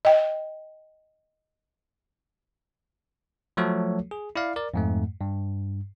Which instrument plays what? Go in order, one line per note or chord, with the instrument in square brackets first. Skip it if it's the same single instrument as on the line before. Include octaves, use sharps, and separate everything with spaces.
[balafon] D#5 G5
[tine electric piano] F3 F#3 A3 F#4 A4 C#5
G#4
E4 D5 F5
A#4 D5
F2 G#2 A3
G2